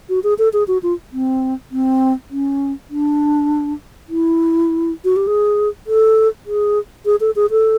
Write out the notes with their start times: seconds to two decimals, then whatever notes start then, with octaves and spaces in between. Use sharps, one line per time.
0.09 F#4
0.24 G#4
0.38 A4
0.53 G#4
0.68 F#4
0.83 F4
1.13 C4
1.71 C4
2.31 C#4
2.90 D4
4.09 E4
5.04 F#4
5.16 G4
5.27 G#4
5.87 A4
6.46 G#4
7.06 G#4
7.21 A4
7.36 G#4
7.51 A4